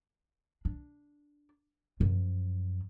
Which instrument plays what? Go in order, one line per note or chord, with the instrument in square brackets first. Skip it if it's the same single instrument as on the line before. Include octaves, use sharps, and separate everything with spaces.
[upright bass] D4
F#2 F3